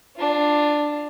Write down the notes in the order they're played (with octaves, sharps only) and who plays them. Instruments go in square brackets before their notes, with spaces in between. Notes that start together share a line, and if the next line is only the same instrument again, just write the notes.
[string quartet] D4 F4